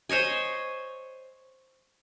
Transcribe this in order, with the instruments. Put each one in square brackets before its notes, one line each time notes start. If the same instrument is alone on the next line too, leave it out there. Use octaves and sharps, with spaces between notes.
[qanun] C5 C#5 D#5 G#5